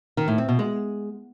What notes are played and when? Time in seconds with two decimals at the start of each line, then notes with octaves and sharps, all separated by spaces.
0.17 D#3
0.28 A2
0.38 C4
0.49 B2
0.59 G#3